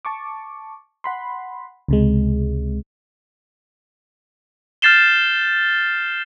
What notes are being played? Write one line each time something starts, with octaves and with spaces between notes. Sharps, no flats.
A5 C#6 D6
F#5 B5 C6
C#2 C3 G#3
F6 G6 A6 C7 E7 G7